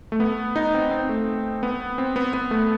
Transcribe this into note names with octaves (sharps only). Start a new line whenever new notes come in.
A3
B3
D#4
C4
C4
A3
B3
C4
B3
B3
A3